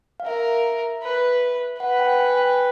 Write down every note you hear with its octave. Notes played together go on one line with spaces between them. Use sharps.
F5
A#4 E5
B4
B4 F#5
G5
G#5
G5